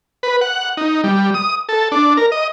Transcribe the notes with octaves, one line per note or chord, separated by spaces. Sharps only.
B4
F#5
D#4
G3
D#6
A4
D4
A#4
D#5